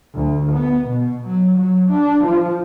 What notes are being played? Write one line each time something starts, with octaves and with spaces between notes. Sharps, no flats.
D2
B3
B2
F#3
F#3
D4
F3